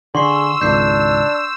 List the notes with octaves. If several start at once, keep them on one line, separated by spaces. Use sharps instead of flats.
D3 G#4 C6 C#6 E6 C7
G#1 C#2 D4 G6 C7